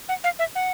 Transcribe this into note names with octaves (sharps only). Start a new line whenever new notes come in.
F#5
F5
E5
F#5